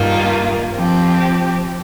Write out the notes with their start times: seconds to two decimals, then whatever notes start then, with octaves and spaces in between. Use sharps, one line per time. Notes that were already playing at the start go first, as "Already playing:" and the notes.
Already playing: G2 D#3 A#3 F4
0.76 F3 C4 G4